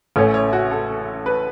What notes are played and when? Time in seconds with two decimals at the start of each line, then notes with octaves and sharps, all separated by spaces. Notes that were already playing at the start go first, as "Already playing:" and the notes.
0.16 A1 A2 A3 C#4 C#5
0.34 C#5
0.53 F#4
0.71 A4
1.26 B4